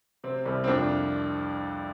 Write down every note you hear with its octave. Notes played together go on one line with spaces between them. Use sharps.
C3 C4
C2
C4
F2 D4